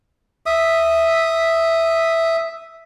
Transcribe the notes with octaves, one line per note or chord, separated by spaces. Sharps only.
E5 D#6